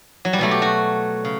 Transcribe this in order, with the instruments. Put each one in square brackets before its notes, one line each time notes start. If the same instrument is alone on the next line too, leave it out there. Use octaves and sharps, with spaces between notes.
[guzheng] F#3
G3
B2 F#3 A3
G4
F#4
C#3